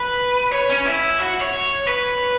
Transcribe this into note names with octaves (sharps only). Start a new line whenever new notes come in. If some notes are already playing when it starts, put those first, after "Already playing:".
Already playing: B4
C#5
C#4
E4
F#4
C#5
B4